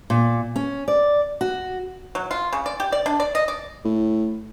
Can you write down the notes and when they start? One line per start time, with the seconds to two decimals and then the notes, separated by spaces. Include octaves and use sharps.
0.10 A#2
0.56 C#4
0.88 D5
1.41 F#4
2.15 F#3
2.31 F4
2.53 C#3
2.66 D5
2.80 G4
2.92 D5
3.06 D4
3.20 D5
3.35 D#5
3.48 D5
3.85 A2